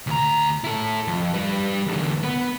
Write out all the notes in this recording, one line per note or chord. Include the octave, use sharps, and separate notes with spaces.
D2 A#5
E4 A4
F2
G3 B4
E2 D3
B3 B4